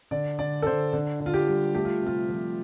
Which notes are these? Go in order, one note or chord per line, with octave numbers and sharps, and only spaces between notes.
D3 D5
D3 D5
A4
D3 C5
D3
D3
F4
G4
G3
A3 G4
F4
C3 F4
F3